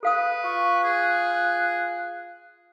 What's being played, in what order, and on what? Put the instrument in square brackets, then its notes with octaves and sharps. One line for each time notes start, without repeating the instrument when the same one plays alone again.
[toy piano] A4 F5 D#6 [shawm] B4
[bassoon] F4 [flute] C#6
[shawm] G#4 [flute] F#6